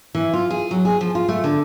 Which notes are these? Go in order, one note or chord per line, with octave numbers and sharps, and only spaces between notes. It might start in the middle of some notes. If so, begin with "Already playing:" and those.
E3
F4
G#4
F#3
G#4
F3
F4
A3
D3